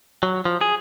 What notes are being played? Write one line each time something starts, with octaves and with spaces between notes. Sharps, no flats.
F#3
F3
G#4